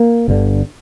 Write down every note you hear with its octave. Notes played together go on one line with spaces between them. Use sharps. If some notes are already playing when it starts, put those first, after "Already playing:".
Already playing: A#3
G1 G2 D3